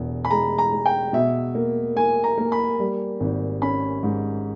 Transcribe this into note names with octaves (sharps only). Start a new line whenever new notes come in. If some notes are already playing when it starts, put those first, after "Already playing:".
Already playing: E1 E2
B5
G#3 A#5
A#5
G#3
G5
B2 E5
A#3
A#3 G#5
A#5
A#3
B5
G3
G#1
C#4 B5
G#2